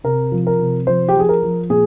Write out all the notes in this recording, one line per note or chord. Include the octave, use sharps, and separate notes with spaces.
C3 A#4
F3
A#4
C3
F3 C5
G4
F3 G#4
A#4
F3
A#2 G#4